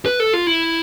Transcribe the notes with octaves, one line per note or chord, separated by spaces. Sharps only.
B4
A4
F4
E4